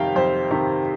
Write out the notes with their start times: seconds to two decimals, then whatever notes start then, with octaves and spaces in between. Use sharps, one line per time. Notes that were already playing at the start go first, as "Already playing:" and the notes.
Already playing: F2 C3 D#3 F5 G5
0.15 F2 C5
0.51 C3 D#3